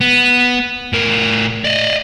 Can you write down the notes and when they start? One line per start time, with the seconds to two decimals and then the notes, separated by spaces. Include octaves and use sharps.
0.01 B3
0.93 A2 A#4
1.64 D5 D#5